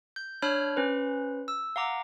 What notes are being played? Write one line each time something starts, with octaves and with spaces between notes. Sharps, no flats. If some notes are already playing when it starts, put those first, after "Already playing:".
G6
D4 C#5 B5 F6 G6
C#4 B4 C5
E6
F5 F#5 A#5 D6